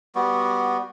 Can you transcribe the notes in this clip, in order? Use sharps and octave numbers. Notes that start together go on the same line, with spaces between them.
G3 B3 F#4